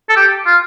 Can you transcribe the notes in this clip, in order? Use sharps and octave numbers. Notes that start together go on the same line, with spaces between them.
A4
G4
F4